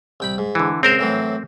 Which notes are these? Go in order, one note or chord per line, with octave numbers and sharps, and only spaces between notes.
C2 G5 B5
G#2
D3 E3
C#2 C4 A#4 C5 A#5 D#6
A2 E3 F#3